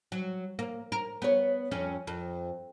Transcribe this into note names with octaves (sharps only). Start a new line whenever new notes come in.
F#3
A#3
A#4
B3 C#5
F2 C#4
F2